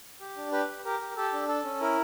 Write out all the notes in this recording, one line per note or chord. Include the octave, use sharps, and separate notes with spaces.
G4
D4
G4 B4
G4
G4 A#4
G4
G4 A4
D4
A4
C#4
E4 A#4